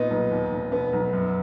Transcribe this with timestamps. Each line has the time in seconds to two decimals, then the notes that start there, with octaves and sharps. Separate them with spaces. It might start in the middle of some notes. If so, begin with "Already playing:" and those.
Already playing: A#2 B3 D#4
0.10 B1
0.31 D#2
0.52 F1
0.72 B2 B3
0.93 B1
1.13 F#2